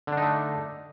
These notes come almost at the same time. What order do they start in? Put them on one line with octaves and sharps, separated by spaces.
D3 D4 D#4 A3